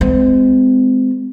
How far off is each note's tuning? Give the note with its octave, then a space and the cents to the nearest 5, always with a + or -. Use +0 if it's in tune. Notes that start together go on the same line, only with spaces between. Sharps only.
G#3 +0 C4 -30